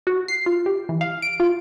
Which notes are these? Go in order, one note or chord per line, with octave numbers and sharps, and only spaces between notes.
F#4
C7
F4
G4
E3
F5
D7
F4